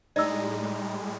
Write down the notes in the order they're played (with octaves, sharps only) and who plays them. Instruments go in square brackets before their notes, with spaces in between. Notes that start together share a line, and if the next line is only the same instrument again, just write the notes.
[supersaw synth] A2 G3 G#3 [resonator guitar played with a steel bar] D#4 [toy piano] D5 E6